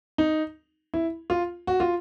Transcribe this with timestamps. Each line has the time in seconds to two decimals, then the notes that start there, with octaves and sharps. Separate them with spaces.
0.18 D#4
0.94 E4
1.30 F4
1.67 F#4
1.80 F4